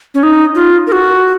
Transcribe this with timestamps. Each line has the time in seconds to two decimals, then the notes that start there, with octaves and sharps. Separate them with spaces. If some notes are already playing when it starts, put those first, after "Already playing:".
0.14 C#4
0.23 D#4
0.55 F4
0.87 A#4
0.92 F#4